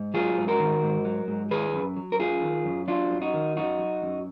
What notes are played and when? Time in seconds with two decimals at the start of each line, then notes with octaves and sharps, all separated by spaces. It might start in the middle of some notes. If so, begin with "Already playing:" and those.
Already playing: G#2
0.14 F#3 F4 G#4
0.38 G#2
0.48 F#4 A#4
0.59 D#3
0.83 G#2
1.05 F#3
1.28 G#2
1.51 D#3 G#4 B4
1.73 F#2
1.97 F#3
2.12 A#4
2.19 F#2 F4 G#4
2.42 D#3
2.65 F#2
2.88 F#3 D4 F4
3.11 F#2
3.22 D#4 F#4
3.34 D#3
3.56 F#2 D#4 F#4
3.79 F#3
4.02 F#2